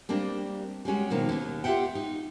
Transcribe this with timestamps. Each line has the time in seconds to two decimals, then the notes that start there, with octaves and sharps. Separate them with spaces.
0.09 G3 A#3 C4 D4
0.85 G3 G#3 C#4 F#4
1.10 B2 D#3 F3 A#3
1.29 D#2
1.64 F4 G4 A4 E5 F#5 G5
1.95 D#4